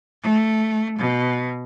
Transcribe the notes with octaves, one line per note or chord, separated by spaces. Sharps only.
A3
B2